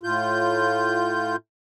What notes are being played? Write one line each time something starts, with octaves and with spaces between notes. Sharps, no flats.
A2 F4 G6